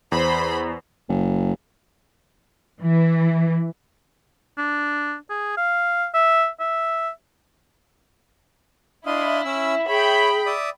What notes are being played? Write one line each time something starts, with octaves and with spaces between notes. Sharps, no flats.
E2 C5 B5
F#1
E3
D4
G#4
F5
E5
E5
D4 E4 D#5 F5 C6
C#4 E5 E6
G#4 C#5 G5 B5
D5 E5 D#6